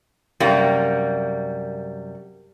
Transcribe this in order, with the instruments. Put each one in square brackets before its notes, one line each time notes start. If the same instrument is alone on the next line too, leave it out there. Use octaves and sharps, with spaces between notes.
[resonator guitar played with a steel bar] F#2 C3 G3 A#3